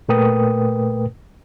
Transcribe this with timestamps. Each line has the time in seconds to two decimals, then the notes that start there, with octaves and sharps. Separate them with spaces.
0.09 A#2 A3 A#4 B4 G5 D#6